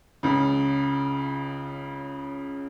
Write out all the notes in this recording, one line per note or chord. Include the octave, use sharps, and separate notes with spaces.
C#2 C#3